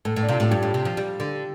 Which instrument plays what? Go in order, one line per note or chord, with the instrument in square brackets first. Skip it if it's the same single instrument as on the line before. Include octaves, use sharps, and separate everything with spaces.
[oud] A2 [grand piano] A4
[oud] A2
[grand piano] D4
[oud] C3 [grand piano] F4
[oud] A2
[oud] G2 [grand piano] G4
[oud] A2
C3
F3
G3
D3